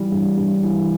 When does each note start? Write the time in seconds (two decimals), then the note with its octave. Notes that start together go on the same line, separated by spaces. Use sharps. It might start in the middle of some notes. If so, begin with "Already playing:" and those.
Already playing: E3 G3
0.12 G2
0.37 G2
0.63 E3